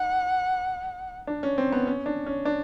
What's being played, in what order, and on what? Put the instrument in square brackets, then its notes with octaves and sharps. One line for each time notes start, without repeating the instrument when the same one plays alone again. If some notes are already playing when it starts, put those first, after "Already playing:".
Already playing: [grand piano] D#4 [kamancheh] F#5
[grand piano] D4
C#4
C4
B3
C#4
D4
C#4
D4